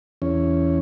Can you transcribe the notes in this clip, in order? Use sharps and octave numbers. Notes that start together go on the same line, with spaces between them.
E2 C#4